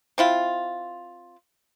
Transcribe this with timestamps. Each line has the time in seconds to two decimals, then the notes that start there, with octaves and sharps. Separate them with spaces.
0.18 C4 E4 F4